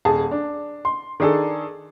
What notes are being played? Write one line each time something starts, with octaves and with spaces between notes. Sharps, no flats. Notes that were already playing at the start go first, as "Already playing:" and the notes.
D#1 G#4 A5
D4
C6
D#3 D4 G#4 A4